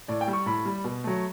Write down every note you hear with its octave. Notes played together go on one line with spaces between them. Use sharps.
A2 D5
G5
G3
C#6
A2 B5
G3
B2
F#3 A3